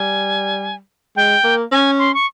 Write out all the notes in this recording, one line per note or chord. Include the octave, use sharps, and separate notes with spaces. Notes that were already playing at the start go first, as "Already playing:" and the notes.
Already playing: G3 G#5
G#3 G5
A#3
C#4 G#5
C6
C#6